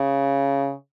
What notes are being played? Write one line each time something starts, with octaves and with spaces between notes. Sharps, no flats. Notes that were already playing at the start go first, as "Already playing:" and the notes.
Already playing: C#3